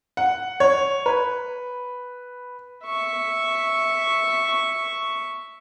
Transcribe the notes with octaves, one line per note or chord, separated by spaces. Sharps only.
F#5
C#5
B4
E5 C#6